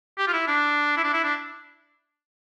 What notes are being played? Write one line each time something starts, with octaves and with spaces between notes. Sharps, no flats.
G4
F4
E4
D4
E4
D4
E4
D4